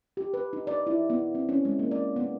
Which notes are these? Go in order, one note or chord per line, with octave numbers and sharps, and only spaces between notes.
G4
B4
D#4
D5
E4
B3
C4
C#4
G#3
A#3
D5
B3